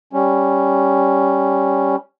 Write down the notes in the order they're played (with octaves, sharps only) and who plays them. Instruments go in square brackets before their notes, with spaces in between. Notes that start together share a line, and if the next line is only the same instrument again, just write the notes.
[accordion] G3 C#4